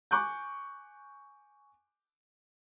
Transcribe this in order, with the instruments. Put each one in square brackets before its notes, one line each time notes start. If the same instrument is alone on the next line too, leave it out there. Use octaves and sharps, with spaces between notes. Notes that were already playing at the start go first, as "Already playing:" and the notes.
[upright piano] G#5 C#6 D6 F#6 G6